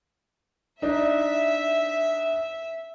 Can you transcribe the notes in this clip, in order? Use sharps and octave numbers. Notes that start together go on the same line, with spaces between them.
D4 D#4 E5